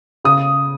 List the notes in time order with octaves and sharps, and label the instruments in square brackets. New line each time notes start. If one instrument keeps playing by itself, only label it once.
[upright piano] C#3 D#6